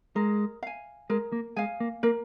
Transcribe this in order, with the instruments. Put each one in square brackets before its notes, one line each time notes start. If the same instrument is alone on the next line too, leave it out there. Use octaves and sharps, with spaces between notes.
[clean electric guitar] G#3 [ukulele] A#4
[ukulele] F5 G#5
[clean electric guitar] G#3 [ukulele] A#4
[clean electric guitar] A#3
[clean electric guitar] G#3 [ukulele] F5 G#5
[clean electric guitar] A#3
[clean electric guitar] A#3 [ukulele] A#4